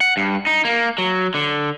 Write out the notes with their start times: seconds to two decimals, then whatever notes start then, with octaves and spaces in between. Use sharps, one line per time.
0.01 F#5
0.17 G2
0.47 D#4
0.65 A#3
0.98 F#3
1.34 D3